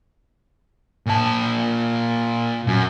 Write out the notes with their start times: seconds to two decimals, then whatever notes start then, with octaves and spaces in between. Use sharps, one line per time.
1.06 A#2 A5
2.67 F#2